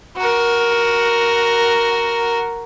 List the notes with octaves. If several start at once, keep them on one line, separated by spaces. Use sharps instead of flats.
F#4 A#4